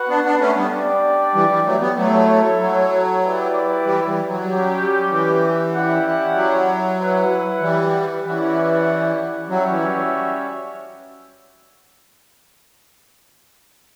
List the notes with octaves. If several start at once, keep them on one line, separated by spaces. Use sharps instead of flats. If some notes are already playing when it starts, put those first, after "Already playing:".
Already playing: F#4 B4 F#5
B3 D4
B3 D4
A3 C#4
G3 B3
D4 G4 D5
E3 G3
E3 G3
F#3 A3
G3 B3
F#3 A3 E4 A4 C#5
F#3
E4 G4 B4 D5
E3 G3
E3 G3
F#3
G3 C#4 G4
E3
C#4 E4 G4 D5 F#5
F#3
E4 B4 F#5
E3 G3
E3 C#4 E4 G4 D5 F#5
F#3 G3 C#4 F#4 C#5 E5
E3